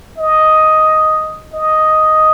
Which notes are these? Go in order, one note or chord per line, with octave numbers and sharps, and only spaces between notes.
D#5
D#5